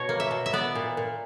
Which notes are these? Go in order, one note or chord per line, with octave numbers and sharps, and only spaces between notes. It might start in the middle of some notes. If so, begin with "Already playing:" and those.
Already playing: B2 C#5
A#3
E5
B2
E5
B3 D5
A#2
A#2